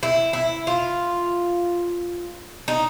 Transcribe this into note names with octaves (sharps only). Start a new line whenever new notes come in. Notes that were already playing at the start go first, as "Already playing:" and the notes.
E4
E4
F4
D#4